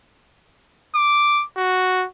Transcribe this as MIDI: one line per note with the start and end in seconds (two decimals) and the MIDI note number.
0.95 1.44 86
1.57 2.06 66